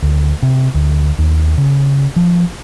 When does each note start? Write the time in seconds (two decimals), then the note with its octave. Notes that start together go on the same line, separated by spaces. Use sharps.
0.02 D2
0.42 C3
0.74 D2
1.18 D#2
1.58 C#3
2.16 F3